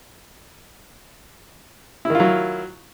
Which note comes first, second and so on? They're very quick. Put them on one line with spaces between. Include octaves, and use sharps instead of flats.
E4 D#3 F4 F#3